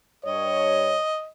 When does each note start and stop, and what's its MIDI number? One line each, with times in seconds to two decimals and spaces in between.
0.25 0.96 43
0.25 0.96 73
0.25 1.27 75